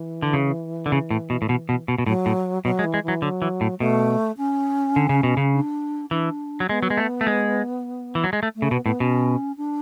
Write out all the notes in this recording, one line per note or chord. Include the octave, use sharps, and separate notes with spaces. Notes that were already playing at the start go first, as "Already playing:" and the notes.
Already playing: E3
D3
C#3
D3
C#3
A2
B2
A2
B2
B2
B2
B2
A2 F#3
A2
B2 F#3
G#3
E3
G#3
E3
F#3
D3 F#3
E3
A2
B2 A3
C#4
D3
C#3
B2
C#3
D4
E3 D4
F#3
G#3 B3
F#3
G#3
A3
A3
G#3
E3
F#3
G#3
A3
A3
C#3
B2 B3
A2 B3
B2 C#4
D4